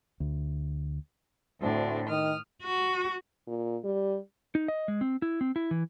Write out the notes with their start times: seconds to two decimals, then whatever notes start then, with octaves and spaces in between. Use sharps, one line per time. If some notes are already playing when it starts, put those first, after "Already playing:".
0.20 D2
1.61 D2 A2 C4 D4
2.09 D#3 D#6 F6
2.63 F#4
3.47 A#2
3.84 G3
4.55 D#4
4.68 D#5
4.88 G#3
5.01 C4
5.22 E4
5.41 C4
5.56 E4
5.71 E3